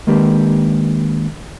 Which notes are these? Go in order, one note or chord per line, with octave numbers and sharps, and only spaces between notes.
D#3 G#3 A#3 D4 G4 B4